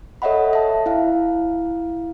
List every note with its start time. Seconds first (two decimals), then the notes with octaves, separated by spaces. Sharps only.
0.22 A4 C#5 D#5 E5 F#5 B5
0.53 E5 A5
0.86 E4 F5